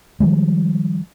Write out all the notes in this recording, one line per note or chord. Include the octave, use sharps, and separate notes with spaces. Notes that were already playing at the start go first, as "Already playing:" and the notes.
D#3 F3 G3 G#3